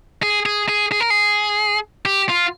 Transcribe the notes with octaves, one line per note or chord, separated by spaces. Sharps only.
G#4
G#4
G#4
G#4
A#4
G#4
G4
F4